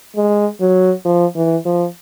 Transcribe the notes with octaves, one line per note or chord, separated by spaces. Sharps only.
G#3
F#3
F3
E3
F3